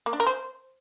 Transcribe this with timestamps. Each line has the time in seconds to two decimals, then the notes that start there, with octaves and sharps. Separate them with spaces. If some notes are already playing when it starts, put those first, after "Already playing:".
0.06 A#3
0.13 D4
0.20 A#4
0.27 C5